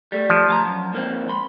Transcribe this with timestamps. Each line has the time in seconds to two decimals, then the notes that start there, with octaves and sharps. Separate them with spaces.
0.12 G3 A3
0.30 F3
0.48 D2 A5 A#5
0.65 F#2
0.93 G#2 A#3 C4
1.29 B5 C6